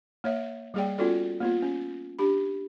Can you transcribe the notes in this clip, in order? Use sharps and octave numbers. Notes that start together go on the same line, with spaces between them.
A#3 C#5 E5
G3 A#3 G#4 D5 G5
B3 C#4 F4 F#4 A4 D5
A#3 B3 F4
C#4
D4 G4 B5